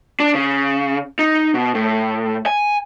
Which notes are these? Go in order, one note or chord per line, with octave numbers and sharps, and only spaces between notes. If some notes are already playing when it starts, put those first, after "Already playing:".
D4
C#3
D#4
B2
A2
G#5